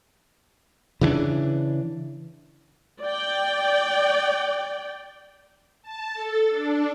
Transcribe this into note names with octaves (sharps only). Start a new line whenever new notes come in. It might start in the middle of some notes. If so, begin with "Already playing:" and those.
C#3 E3 C4 D4
D5 G5
A5
A4
D4